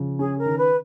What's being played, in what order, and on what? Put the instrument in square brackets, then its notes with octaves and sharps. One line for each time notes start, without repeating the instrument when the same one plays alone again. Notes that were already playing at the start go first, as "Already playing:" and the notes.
Already playing: [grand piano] C#3 F3
[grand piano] C#4 [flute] G#4
[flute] A#4
[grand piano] D#3
[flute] B4